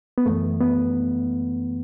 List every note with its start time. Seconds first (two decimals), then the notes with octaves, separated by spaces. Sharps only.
0.18 B3
0.26 F#2 E3 A3
0.61 B3